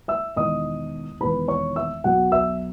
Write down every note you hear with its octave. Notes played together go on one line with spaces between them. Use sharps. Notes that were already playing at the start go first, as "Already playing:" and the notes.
E5 E6
E1 E2 D#3 D#5 D#6
E1 E2 D#3 B4 B5
C#5 C#6
E5 E6
B1 B2 F#3 B3 F#4 F#5
E5 E6